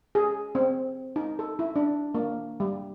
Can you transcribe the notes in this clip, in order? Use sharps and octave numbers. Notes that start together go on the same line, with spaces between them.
G#4
C4
D#4
A4
E4
D4
A#3
G3